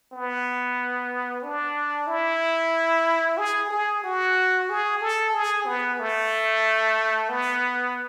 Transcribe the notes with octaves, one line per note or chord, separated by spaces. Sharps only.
B3
D4
E4
G#4
G#4
F#4
G#4
A4
G#4
B3
A3
B3